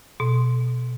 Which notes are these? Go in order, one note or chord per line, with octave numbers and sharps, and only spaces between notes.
B2